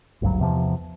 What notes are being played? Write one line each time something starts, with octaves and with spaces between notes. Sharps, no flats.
G#1 D2 G2 F#3
E2 C3 F3